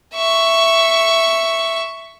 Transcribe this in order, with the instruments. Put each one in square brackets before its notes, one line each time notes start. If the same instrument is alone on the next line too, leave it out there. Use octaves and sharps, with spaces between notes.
[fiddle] E5 C#6